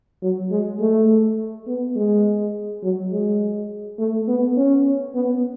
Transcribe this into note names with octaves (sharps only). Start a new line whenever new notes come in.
F#3
G#3
A3
B3
G#3
F#3
G#3
A3
B3
C#4
B3